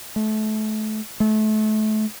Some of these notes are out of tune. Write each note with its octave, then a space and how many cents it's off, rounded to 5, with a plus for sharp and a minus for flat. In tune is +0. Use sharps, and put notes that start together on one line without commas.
A3 -30
A3 -30